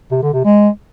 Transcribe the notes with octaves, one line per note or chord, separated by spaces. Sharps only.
C3
D3
C3
G#3